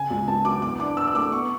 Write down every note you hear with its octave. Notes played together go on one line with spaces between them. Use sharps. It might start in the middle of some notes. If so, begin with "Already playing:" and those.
Already playing: C#3 G#5
C#2
C#2 A5
F#3 D6
E2 D6
D4 D6
E2 E6
E6
A3 D6
B3 C#6